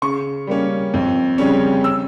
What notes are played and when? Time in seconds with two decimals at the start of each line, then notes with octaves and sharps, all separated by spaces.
0.02 C#3 C#6
0.47 G3 A#3 C#4
0.94 F2
1.38 C#3 G3 C#4
1.84 E6